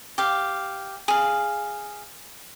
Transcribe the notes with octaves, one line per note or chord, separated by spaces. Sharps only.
G4 F5
G#4 F5